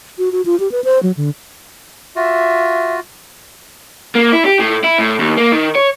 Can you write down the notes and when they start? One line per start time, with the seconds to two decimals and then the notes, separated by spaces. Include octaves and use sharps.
0.18 F#4
0.32 F#4
0.45 F4
0.60 G4
0.72 B4
0.84 C5
1.03 F#3
1.17 D3
2.16 F4 F#4 E5
4.15 A#3
4.32 E4
4.45 G4
4.59 A2
4.84 E4
4.99 A2
5.19 D#2
5.37 A#3
5.53 D#3
5.76 C#5